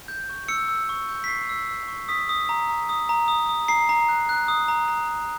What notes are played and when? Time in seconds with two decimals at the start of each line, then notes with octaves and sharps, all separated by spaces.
0.08 G6
0.29 C#6
0.48 E6 C#7
0.68 E6
0.89 C#6
1.09 G6
1.24 B6
1.28 C#6 C7
1.49 E6
1.69 E6
1.88 C#6
2.08 D#6 B6
2.29 D#6
2.49 A#5
2.69 A#5
2.89 D#6
3.09 A#5
3.28 D#6
3.49 D#6
3.68 A#5 C7
3.89 A#5
4.08 F#6
4.29 F#6
4.48 D#6
4.68 A#5
4.88 A#5
5.08 A#5